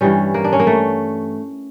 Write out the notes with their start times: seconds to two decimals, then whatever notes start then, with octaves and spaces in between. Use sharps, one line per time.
0.01 G2 E3 G3 C#4
0.34 A#3
0.44 D4
0.53 C#4
0.60 A#3
0.67 A3